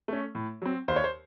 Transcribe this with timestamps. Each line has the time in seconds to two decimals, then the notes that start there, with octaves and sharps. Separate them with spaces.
0.08 A3 C#4
0.35 A2
0.62 F#3 C4
0.88 D#2 C5
0.96 C#5
1.04 C5